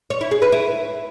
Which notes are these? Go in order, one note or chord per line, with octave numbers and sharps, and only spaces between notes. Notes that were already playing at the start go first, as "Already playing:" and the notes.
C#5
E4
G#4
B4
E4